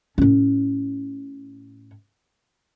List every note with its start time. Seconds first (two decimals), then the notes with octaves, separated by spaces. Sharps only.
0.18 A2 C#4